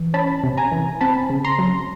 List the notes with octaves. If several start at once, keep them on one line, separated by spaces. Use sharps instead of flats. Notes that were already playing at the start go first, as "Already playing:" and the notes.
Already playing: E3
C#4 A5 B5
C3
G#5 A#5
E3
C4 A5 B5
C#3
A#5 C6
F#3